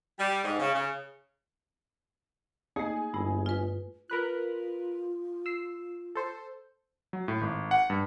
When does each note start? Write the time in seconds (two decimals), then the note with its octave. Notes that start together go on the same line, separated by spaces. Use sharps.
0.19 G3
0.44 G#2
0.59 C#3
0.74 C#3
2.76 A3 A#3 D#4 G#4 G#5
3.14 G1 G2 A3 E4
3.46 F4 B4
4.10 F4 A#4 B4 F#6
5.46 E6 C7
6.15 A4 C5
7.13 F#3
7.28 A2
7.41 G#1
7.71 F#5
7.90 G2